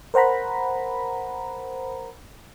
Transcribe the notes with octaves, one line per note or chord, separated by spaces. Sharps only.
A#4 C5 F#5 A#5 B5